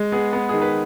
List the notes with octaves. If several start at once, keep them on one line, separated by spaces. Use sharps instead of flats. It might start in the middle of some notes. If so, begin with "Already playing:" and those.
Already playing: G#3
B3 G#4
B3
D#3 G#4
B4